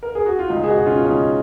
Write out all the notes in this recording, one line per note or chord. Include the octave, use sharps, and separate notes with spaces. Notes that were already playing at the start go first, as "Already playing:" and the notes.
A#4
G#4
F#4
F4
C#2 D#4
G#4
D#4 F#4
B2
C#4 F4
C#2 D#4